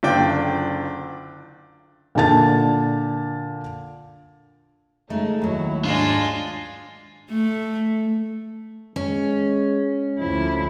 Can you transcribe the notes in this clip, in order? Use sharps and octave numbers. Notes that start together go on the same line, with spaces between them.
F#1 D3 F4 D5 G5
A#2 D3 A5 A6
C#3 G#3 A3 D#4
D#2 F#3 A3 E4 F#4
G#2 G#3 D4 F4 D5
A3
G#3 C#4
D2 F3 E4